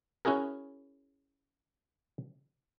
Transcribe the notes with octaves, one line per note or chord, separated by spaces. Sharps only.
C#4 E4 F#4 G#4 A#4